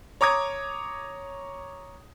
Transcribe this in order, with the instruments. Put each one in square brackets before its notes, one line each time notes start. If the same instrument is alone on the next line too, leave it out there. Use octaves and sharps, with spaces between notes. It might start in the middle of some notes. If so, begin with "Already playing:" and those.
[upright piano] C#5 A#5 D6 D#6 G#6